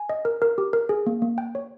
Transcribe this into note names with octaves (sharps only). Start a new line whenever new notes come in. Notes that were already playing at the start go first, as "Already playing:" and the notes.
Already playing: G#5
D#5
A#4
A#4
G4
A#4
G#4
A#3
A#3
G5
C#5